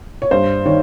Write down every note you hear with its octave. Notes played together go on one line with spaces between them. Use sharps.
C#5
G2 C5
D#3 C#5